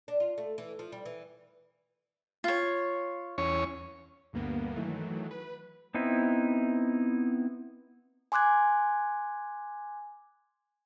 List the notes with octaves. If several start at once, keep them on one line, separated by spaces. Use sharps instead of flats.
D4
F4
A3
E3
F3
G3
E3
F4 C#5
E2 C#4 C#5
D2 G2 A#3 B3
D#3 E3 F#3 A3
B4
B3 C4 D#4 E4
G#5 C6 D6 F#6 G#6